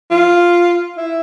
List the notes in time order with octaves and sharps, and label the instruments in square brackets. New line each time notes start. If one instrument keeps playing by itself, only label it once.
[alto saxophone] F4
E4